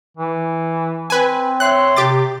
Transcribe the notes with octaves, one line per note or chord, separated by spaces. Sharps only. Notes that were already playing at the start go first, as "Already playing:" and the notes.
E3
C4 B4 G#5
C#5 E5 C6 F#6
C3 G4 D6 A6